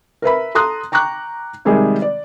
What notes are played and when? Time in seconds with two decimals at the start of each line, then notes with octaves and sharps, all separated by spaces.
0.22 A#4 B4 E5 B5
0.55 A4 A#5 C6 D#6 F#6
0.92 G5 A#5 C#6 D6 F#6
1.65 C3 D#3 G3 G#3 G#4
2.02 D5